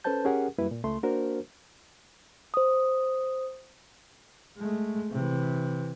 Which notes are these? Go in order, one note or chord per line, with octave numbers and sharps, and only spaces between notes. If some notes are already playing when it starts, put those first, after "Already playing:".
C#4 A4 B4 C5 A5 G6
C#4 G4 G#4 A#4 F#5
F#2 G3 A#3 E4 B4
A#2
C#2 A3 C6
A#3 D4 F#4 A#4 C5
C5 D#6
G#3 A3
C3 E3